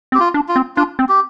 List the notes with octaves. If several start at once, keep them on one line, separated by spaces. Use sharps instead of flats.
C4
G4
F4
D4
F4
C4
D4 F4
C4
G4